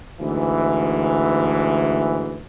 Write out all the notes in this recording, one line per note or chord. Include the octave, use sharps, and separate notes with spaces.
D2 G#2 E3